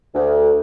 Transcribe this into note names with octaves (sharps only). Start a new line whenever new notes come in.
D2